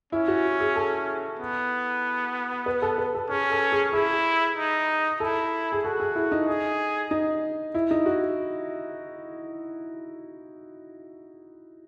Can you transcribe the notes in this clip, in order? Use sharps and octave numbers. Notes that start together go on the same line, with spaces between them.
C#4 E4
F#4
G#4
A4
B3
B4
A4
B4
A4
C#4 G#4
A4
G#4
E4 G#4
D#4
E4 A4
G#4
F#4 A4
G#4
E4
D#4
G#4
D#4
E4
D#4
F#4